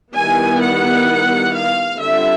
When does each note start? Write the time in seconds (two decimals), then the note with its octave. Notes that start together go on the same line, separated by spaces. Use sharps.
0.13 D#3 G3 B3 E4 G#5
0.60 F#5
1.55 F5
2.01 D3 G3 C4 F4 E5